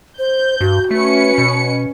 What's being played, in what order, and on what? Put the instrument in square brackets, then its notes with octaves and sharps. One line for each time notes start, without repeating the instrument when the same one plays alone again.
[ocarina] C5 [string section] G6
[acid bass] G2 [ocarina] F#4
[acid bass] A3 [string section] C#4 B4 C#7
[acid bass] B2